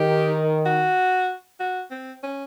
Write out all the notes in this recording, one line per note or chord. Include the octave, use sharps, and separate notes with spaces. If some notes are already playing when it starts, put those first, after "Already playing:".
Already playing: D#3 G4
F#4
F#4
C4
C#4